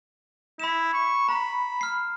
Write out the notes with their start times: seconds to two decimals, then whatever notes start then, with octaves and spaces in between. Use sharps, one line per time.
0.60 E4 B5 E7
0.93 C#6
1.29 A#5 B5
1.81 F6 C7